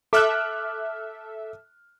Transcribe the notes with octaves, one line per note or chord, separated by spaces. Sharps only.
A4 E5 D6 F6 F#6